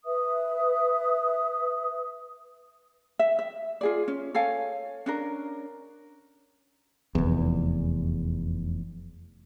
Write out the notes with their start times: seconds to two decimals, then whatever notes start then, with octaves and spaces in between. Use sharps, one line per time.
0.06 B4 E5 D#6
3.19 E5
3.39 E5
3.81 F4 G#4 D5
4.08 C#4
4.34 A4 C#5 F5 G#5
5.06 C#4 D4 A#4
7.15 F1 E2